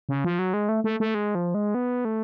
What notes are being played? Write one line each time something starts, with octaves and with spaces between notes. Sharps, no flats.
C#3
F3
F#3
G#3
A3
A3
A3
G#3
F3
G#3
B3
A3